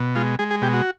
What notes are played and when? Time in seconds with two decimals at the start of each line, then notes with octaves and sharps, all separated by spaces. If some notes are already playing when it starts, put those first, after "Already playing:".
Already playing: B2
0.15 G#3 F4
0.39 G#3 G#4
0.51 G#4
0.62 B2 G4
0.73 F#4